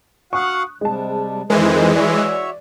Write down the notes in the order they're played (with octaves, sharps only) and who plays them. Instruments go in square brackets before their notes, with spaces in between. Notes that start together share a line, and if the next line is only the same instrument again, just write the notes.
[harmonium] F#4 F5 F#5 [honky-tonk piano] C#6 D#6 F#6
[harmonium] C3 G3 [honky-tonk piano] G#3 A5
[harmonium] F2 D#3 C5 [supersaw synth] E3 G#3 [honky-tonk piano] A#4
[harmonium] F#4 C#5 E5 [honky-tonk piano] D5